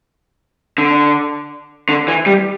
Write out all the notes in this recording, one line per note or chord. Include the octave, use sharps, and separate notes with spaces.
D3
D3
E3
G3